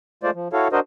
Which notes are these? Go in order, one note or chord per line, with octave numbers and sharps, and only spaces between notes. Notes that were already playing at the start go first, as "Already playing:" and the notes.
G#3 A3 F4 C5 D5
F3
E4 F#4 A4 C#5 F5
D4 F#4 A#4 C5 D#5